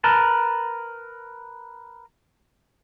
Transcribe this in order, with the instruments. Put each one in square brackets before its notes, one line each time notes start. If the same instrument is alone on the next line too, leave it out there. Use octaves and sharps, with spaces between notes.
[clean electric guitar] A#4 B4 A5